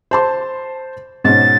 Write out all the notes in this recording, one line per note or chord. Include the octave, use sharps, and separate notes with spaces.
C5 A5 C6
G#2 B2 C#4 A6